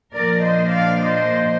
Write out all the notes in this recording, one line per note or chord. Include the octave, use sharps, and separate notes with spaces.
A#2 F3 A#3 D4 A#4 D5
C5 D#5
D5 F5
C5 D#5